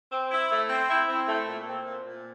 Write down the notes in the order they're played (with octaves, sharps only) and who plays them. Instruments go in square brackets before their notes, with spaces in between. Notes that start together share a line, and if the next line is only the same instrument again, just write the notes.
[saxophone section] C4
E4
A3
C4
E4
C4
A3
A#2
C4
A#2
A#2